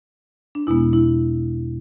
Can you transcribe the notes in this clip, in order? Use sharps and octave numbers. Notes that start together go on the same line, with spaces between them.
D4
E2 B2 G#3 B3 E4
E4